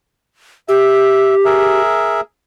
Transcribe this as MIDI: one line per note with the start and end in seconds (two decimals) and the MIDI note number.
0.69 1.81 67
0.69 1.35 76
1.45 2.21 68
1.45 2.21 70
1.45 2.21 76